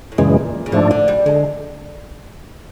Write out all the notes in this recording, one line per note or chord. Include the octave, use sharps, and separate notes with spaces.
A2
F#2 A#2 C#3 E3 G#3
C#3
G#2 D3 F3 A3 D4
D3
G3
D3 G#3